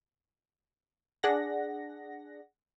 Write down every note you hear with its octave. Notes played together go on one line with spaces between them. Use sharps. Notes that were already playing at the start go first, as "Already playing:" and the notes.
D4 G#4 F#5 A#6